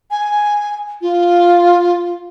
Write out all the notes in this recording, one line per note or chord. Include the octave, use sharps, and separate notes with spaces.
G#5
F4